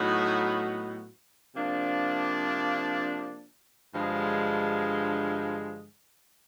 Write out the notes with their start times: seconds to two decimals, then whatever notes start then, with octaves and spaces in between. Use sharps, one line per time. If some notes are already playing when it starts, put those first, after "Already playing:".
Already playing: A2 F#3 B3 D#4 F#4
1.54 C3 F3 A#3 D4
3.94 G2 D3 F3 G#3